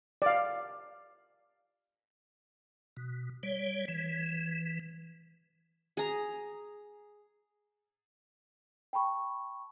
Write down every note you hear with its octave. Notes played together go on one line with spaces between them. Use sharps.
D5 F5
B2
G3 C#5
E3
G#4 A#5
G5 A5 B5 C#6